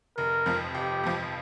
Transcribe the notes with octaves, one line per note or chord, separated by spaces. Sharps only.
F1 A#4
F2 F3
F1 G4
F2 F3